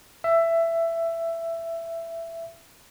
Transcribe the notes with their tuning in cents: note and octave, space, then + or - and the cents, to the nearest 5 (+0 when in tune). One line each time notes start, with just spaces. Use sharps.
E5 +15